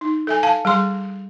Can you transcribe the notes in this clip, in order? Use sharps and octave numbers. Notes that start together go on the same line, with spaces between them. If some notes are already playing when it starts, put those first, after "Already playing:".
D#4
A4 E5 G#5
F5 A5
G3 G#4 C6